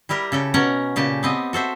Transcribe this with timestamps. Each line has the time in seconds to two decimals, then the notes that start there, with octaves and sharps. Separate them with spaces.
0.09 G3 E4 G4 A#4
0.32 C#3 A4 G5
0.54 B2 C#4 A#4 F#5
0.96 A#2 C#3 G4 A5
1.23 B3 C4 D#5
1.53 F#4 A4 C5 E5